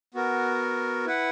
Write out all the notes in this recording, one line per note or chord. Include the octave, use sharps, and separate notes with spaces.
B3 F#4 A#4
E4 B4 F#5